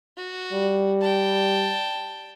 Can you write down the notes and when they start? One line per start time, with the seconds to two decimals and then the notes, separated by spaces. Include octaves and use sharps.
0.17 F#4
0.53 G3
1.01 G5 A5